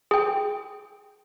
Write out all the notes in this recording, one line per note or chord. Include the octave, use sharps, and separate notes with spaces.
G#4 G5